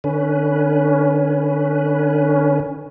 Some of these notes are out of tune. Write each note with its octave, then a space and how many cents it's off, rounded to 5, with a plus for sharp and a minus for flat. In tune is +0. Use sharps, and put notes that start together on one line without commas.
D3 +35 C#4 +15 B4 +0